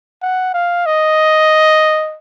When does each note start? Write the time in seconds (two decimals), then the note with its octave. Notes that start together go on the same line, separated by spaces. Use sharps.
0.22 F#5
0.54 F5
0.86 D#5